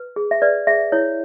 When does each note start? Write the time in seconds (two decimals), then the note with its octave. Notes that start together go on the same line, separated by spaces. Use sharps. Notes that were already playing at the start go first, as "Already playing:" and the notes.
Already playing: B4
0.16 G#4
0.31 E5
0.42 B4 D5
0.67 G#4 E5
0.92 E4 C#5